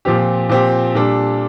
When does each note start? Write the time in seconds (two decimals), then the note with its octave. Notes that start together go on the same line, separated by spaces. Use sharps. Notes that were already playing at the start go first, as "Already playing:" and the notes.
0.05 A#2 F3 C4 G4
0.49 A#2 F3 C4 G4
0.95 A#2 G3 D4 A4